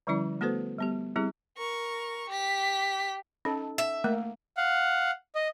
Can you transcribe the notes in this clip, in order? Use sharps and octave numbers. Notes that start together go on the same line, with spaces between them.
D3 F3 G3 C#4 E4 D5
A3 B3 F#4 A4 B4 C5
G3 B3 G4
G3 C4 E4 G4 G#4
A#4 C#6
G4 B6
C#4 D#4 A4
E5
A3 A#3
F5 F#5
D#5